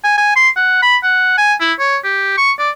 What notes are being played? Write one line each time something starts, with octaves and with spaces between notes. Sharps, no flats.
G#5
G#5
C6
F#5
B5
F#5
G#5
E4
C#5
G4
C#6
D5